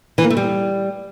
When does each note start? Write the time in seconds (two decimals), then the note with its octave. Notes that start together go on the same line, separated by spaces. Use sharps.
0.18 E3
0.24 A#3
0.30 A3
0.37 G3